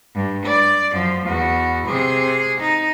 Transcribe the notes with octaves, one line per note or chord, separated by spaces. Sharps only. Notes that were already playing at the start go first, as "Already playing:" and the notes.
G2
D5
F#2 F3
E2 F#4
C3 G#4
D#4